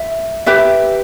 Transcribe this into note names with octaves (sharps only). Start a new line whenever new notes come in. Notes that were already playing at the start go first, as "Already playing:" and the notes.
Already playing: E5
G4 B4 E5